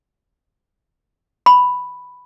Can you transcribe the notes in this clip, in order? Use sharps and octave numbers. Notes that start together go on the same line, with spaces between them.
B5